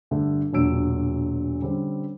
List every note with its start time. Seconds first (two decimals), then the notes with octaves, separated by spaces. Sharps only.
0.11 G2 D3 A3
0.53 E1 A#2 F#3 D4 E6 D7
1.62 D3 G3 C4 C#4